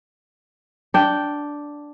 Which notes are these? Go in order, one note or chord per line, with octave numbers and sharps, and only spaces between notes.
D4 G5